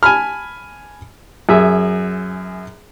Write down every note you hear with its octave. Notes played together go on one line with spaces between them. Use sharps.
G#5 A5 B5 F6
F#2 G#4 E5